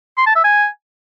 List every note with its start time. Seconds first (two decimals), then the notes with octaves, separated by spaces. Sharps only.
0.17 C6
0.26 A5
0.35 E5
0.44 G#5